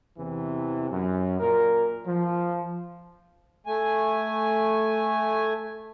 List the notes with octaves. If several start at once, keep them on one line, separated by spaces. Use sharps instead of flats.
E2 C3 E3
F#2
A#2 A#4
F3
A3 G#5